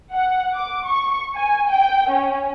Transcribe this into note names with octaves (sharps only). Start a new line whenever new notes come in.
F#5
D6
C#6
G#5
G5
C#4